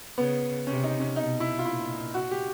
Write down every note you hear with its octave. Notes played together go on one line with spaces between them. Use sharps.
C#3 B3
C3 C#4
D#4
C#4
B2 D#4
E4
F4
A#2 E4
F#4
G4